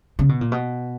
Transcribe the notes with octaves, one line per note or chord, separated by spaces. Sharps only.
C#3
B2
A#2
B2